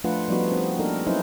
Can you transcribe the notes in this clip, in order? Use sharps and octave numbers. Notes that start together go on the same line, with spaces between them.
F3 A3 D4 F4 B4 F#5
F3 G3 B3 D#4 F#4
C4
A#3 D4 D#4 A4 A#4
F#3 C#4 D#4 E4 B4 C5